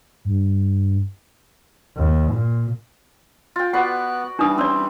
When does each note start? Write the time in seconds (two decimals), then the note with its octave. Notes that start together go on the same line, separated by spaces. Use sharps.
0.25 G2
1.97 D#2
2.31 A#2
3.56 F4 G5
3.73 B3 F#4 B4 D5 F#5 F#6
4.39 E3 G3 D4 D#4 D#6
4.58 C4 C#4 D5